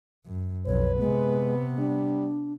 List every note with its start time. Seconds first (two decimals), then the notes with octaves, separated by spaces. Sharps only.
0.26 F#2
0.66 B1 F2 B4 C#5
0.99 C3 G#3 B3
1.78 G3 D4